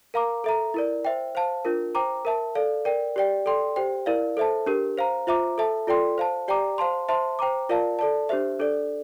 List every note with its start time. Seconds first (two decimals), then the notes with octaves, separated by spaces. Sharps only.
0.14 A#4 F5 A#5 D6
0.44 A4 E5 A#5
0.74 E4 A#4 D5
1.05 C5 E5 G5
1.35 C5 F5 A5
1.65 D4 F4 A#4
1.95 C5 G5 A#5 D6
2.25 A#4 E5 A5
2.55 A4 D5 F5
2.85 A#4 D5 G5
3.16 G4 D5 G5
3.46 A4 D5 G5 C6
3.76 G4 C5 G5
4.06 E4 A#4 D5 F5
4.37 A4 C5 E5 A5
4.66 D4 G4 A#4
4.97 C5 F5 A#5
5.27 F4 C5 E5 A#5 D6
5.58 A4 E5 A5
5.87 F4 A4 D5 G5 C6
6.18 C5 F5 A5
6.48 G4 D5 G5 A#5 D6
6.78 C5 F5 A5 C6
7.09 C5 E5 A5 C6
7.39 C5 G5 A#5 D6
7.69 F4 A#4 D5 F5 A5
7.99 A4 D5 A5
8.29 D4 G4 C5 E5
8.59 D4 A4 D5